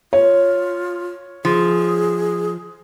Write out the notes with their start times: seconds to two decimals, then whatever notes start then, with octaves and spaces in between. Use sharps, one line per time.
0.13 F4 C#5
1.45 F3 G#4